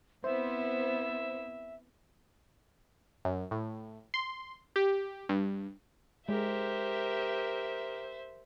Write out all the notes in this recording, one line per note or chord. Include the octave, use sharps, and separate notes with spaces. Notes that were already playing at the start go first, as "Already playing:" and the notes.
B3 C4 E4 C5 E5
F#2
A2
C6
G4
G2
G#3 G4 A#4 C5 E5